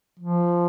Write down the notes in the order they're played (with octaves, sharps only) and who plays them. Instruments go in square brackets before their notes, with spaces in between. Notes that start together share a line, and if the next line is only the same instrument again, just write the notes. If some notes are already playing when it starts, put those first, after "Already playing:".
[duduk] F3